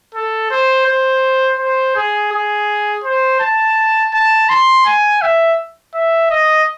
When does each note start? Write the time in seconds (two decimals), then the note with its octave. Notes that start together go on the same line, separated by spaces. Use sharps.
0.15 A4
0.51 C5
0.87 C5
1.59 C5
1.96 G#4
2.32 G#4
3.04 C5
3.40 A5
4.13 A5
4.49 C6
4.86 G#5
5.22 E5
5.94 E5
6.31 D#5